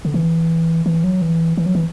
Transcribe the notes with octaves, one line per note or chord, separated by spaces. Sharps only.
D3
E3
E3
F#3
E3
E3
F#3
E3